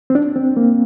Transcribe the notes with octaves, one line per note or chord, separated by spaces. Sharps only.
C4
D4
C4
A#3